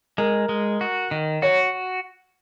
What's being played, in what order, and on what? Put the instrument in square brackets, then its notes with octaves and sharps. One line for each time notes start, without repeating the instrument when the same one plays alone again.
[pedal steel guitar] G#3 [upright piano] A#4
[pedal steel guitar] G#3
F#4
D#3
[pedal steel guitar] F#4 [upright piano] C#5